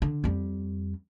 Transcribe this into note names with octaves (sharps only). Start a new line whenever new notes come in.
D3
F2 G3